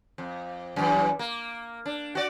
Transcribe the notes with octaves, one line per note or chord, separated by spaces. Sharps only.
F2
F#2 E3
A#3
D4
F#4 D5